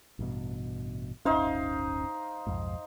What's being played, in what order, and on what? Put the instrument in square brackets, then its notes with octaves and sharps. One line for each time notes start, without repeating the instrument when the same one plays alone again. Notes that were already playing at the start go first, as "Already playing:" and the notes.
[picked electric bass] A1 G2 B2
[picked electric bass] D1 G1 C#4 [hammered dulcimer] D#4 C5 F5
[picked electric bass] B1 F2 G#2